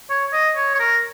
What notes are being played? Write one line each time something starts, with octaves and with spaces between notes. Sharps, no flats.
C#5
D#5
C#5
C#5
A#4